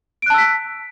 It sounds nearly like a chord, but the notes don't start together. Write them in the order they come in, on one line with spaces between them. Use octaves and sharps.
D7 F#6 A5 E6 B6